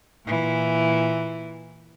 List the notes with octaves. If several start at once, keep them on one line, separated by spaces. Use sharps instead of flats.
A#2 E3